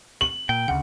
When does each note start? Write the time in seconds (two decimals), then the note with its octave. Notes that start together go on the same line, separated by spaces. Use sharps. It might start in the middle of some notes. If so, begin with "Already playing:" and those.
0.21 F#7
0.49 A#2 G5
0.68 D2 C#3 F#5